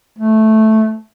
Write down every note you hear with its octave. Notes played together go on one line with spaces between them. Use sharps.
A3